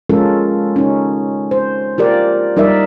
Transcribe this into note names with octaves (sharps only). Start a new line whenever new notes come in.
G#3 C#4 F4 A4 A#4
C#4 D#4
C5
F4 G4 A#4 D5
G3 D#4 A#4 D5 E5